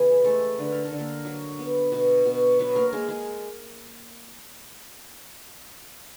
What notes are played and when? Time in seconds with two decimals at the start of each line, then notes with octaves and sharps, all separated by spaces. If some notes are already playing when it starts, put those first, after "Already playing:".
Already playing: C#3 E3 B3 G#4
0.24 G#3 A3 A4
0.58 D3 B4
0.72 A#4
0.85 A4
0.92 D3
0.98 A#3 A#4
1.25 F#3
1.59 B3
1.92 B2
2.25 B2
2.59 F#3 B3 B4
2.75 A#3 A#4
2.93 G#3 A#3 G#4
3.09 G#3 G#4